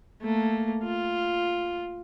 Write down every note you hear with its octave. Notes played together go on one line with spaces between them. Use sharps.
A3 A#3
F4